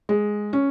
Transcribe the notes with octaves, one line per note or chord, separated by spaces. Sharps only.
G#3
C#4